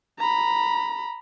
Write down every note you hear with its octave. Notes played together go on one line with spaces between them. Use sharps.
A#5 B5